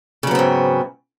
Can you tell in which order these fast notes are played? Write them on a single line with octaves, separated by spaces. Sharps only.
C#3 F#3 B3 C4 G#2